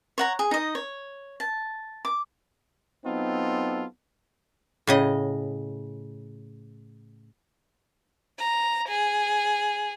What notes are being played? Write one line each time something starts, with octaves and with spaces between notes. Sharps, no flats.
C#5 F#5 A#5
G#4
D#4 D#5
C#5
A5
D6
F#3 B3 C4 D#4 F4 A4
A2 C#3 D#5
A#5
G#4